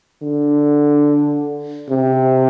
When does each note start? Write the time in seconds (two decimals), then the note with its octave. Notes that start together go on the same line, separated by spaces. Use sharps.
0.22 D3
1.90 C3